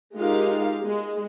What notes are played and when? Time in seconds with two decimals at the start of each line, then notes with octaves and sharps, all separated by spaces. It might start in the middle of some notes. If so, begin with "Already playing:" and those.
0.16 G#3 D#4 F4 G4 A#4 F5
0.83 G#3